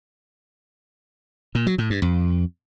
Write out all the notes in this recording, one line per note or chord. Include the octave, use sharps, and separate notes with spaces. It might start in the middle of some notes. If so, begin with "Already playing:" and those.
A#2
F#3
A2
G2
F2